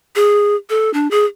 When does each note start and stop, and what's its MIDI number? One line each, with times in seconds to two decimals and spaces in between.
0.16 0.56 68
0.70 0.92 69
0.94 1.10 62
1.11 1.25 68